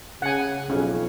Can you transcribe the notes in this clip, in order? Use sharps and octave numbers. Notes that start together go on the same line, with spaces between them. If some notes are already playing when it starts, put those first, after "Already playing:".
C#3 F#5 G#5
B1 F2 C#3 C#4